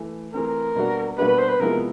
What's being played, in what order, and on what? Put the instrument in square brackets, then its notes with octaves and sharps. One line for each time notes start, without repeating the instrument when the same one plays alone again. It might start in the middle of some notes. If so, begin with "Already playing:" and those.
Already playing: [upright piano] E3 A3
[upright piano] E3 A3 C4 [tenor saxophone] A#4
[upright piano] B2 G3 A#3 D4 F#4
[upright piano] B2 G3 A#3 D4 F#4 [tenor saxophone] B4
[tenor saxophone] B4
C5
B4
[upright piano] C3 F3 G#3 B3 E4 [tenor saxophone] A#4